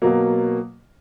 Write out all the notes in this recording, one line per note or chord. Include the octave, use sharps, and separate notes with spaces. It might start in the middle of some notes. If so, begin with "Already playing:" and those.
B2 F#3 A#3